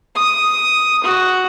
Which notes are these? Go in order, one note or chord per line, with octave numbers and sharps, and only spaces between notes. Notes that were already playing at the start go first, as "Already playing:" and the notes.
D#6
F#4